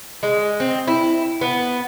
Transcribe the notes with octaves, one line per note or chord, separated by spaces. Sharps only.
G#3
C4
E4
B3